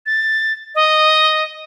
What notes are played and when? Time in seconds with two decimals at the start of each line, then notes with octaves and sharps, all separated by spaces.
0.06 A6
0.75 D#5